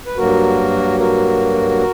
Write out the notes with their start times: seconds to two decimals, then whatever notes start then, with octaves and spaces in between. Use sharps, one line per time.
0.07 B4
0.17 G2 F#3 A#3 F#4 A#4
1.00 F#4 A#4